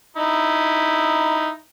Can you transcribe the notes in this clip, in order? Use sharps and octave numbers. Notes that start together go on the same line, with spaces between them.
D#4 E4